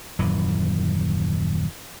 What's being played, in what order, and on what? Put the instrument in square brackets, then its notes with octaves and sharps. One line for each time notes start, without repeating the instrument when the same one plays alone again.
[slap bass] D#1 F#2 E3